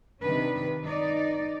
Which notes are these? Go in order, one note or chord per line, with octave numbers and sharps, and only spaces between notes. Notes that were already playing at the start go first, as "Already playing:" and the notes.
C3 D#3 D4 B4
D#4 D5